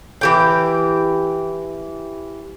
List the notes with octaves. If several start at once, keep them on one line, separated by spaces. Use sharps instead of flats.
E3 G4 G5